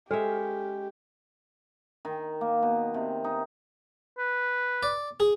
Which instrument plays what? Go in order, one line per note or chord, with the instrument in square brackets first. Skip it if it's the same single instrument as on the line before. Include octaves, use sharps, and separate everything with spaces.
[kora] G#3 C#4 E5 [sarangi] G4 [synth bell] A4
[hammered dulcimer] D#3
A#3
B2
C3
D#4
[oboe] B4
[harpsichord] D5
G#4